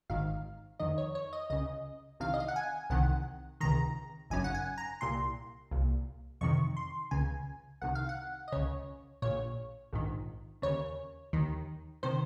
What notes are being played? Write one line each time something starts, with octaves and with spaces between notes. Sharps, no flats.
G#1 G#2 D#3 F5
F2 D#3 D#5
C#5
C#5
D#5
C#2 C#3 D#5
C2 C3 D#3 F5
D#5
F5
F#5
G#5
C2 C3 D#3 F#5
C#2 C3 D#3 A#5
G#1 F#2 C#3 G#5
F#5
G#5
A#5
C2 A#2 C6
C2 A#2
F2 C3 D#3 C#6
C6
C#2 C#3 G#5
C2 C3 D#3 F#5
F5
F#5
D#5
C#2 C#3 C#5
A#1 A#2 C#5
A#1 G#2 D#3
D#2 C#3 C#5
D#2 D#3
C3 D#3 C5